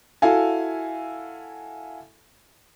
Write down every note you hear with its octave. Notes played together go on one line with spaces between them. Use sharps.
E4 F#4 A4 F5 G#5